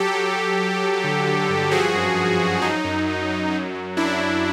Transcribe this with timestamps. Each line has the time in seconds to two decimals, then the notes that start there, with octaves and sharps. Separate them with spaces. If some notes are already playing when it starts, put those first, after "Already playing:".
Already playing: F#3 G4 A4
0.14 F#3
0.36 F#3
0.59 F#3
0.82 F#3
1.04 D3
1.27 D3
1.49 G2
1.71 F3 F#4 G#4
1.94 F#2
2.16 F3
2.39 F3
2.61 F#3 D#4
2.84 F#2
3.07 F#2
3.30 F#3
3.52 F#3
3.75 F#2
3.97 F#2 D4 E4
4.20 F#3